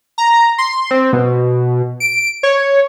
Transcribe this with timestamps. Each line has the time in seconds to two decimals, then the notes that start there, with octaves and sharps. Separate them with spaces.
0.18 A#5
0.58 C6
0.91 C4
1.13 B2
2.00 D7
2.43 C#5